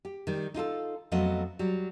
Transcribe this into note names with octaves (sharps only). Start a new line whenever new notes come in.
G4
D#3 G3
D#4 F4 G#4 A4
F2 F#3 A3 B3 D#5
F#3 G3